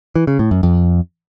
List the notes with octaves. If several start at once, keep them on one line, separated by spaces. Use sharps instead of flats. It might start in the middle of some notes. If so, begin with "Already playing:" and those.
E3
C#3
A2
F#2
F2